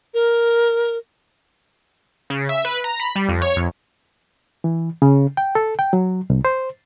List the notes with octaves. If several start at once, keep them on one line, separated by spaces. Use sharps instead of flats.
A#4
C#3
E5
B4
A#5
B5
G3
F2
C#5
F2
E3
C#3
G5
A4
G5
F#3
C2
C5